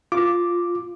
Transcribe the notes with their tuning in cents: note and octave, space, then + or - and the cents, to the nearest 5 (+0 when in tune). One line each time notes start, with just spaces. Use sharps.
F4 +0 D6 +0